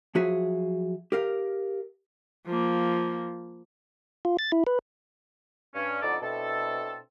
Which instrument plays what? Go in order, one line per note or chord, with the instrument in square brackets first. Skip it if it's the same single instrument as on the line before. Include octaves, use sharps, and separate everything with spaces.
[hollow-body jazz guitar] F3 F#3 F#4 G#4 E5
G4 A#4 F5
[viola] F3 A#3
[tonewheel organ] F4
A6
E4
B4
[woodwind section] G2 C#4
F2 B2 D3 D#4 A4 D5
B2 C4 D4 E4 A4